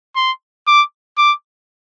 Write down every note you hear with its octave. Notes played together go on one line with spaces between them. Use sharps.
C6
D6
D6